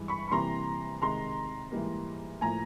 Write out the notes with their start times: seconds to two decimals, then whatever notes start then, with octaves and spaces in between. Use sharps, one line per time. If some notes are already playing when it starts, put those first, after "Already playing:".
Already playing: G2 E3 G#3
0.08 B5 C#6
0.28 B5
0.31 C3 E3 G3 A#3 A#5 C6
1.02 C3 D#3 G#3 A#5 C6
1.72 G#2 E3 G3 A#3
2.41 A2 F3 A#3 G#5 A#5